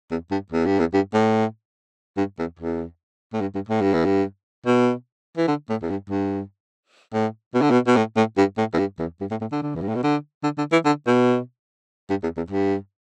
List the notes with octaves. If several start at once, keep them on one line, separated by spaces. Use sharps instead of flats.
E2
G2
E2
G2
E2
G2
A2
G2
E2
E2
A2
G2
G2
A2
G2
E2
G2
B2
E3
D3
A2
E2
G2
G2
A2
B2
D3
B2
B2
A2
A2
G2
A2
E2
G2
E2
G2
A2
A2
D3
D3
E2
G2
A2
B2
D3
D3
D3
E3
D3
B2
G2
E2
E2
G2